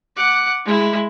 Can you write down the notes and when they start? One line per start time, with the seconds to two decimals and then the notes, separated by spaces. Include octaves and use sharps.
0.16 F#5 D6
0.65 G#3 E4